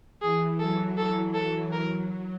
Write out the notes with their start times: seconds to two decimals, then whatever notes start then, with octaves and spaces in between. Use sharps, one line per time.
0.22 E3 G#4
0.59 F#3 A4
0.97 A4
1.34 A4
1.72 F#3 A#4